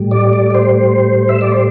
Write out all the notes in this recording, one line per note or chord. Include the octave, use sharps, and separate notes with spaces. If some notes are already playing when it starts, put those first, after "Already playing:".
Already playing: A2 G3
D5
D5
D5
C5
E5
D5
C5